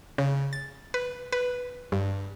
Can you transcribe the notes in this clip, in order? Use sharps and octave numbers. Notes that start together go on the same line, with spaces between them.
C#3
A6
B4
B4
G2